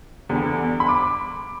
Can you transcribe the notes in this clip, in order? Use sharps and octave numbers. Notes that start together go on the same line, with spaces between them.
E2 D3 G3 B3
B5
D6